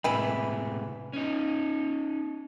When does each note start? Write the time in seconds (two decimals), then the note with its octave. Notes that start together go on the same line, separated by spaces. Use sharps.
0.04 A2 C3 E3 G#3 B5
1.13 C#4 D#4